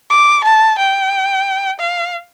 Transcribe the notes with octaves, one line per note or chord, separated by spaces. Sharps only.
D6
A5
G5
F5